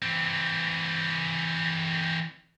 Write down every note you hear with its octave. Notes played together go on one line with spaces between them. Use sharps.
E3 C4